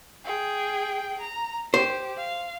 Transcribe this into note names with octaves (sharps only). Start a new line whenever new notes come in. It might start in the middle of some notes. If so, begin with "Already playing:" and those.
G#4 G5
A#5
G4 C5
F5